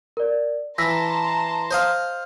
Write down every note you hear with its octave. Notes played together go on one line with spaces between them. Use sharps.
A#4 D5
E3 A5 A#5 C6 E6 A#6 B6
C5 D#5 F5